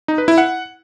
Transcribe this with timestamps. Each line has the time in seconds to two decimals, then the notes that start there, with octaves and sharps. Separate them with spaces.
0.08 D#4
0.18 B4
0.28 E4
0.38 F#5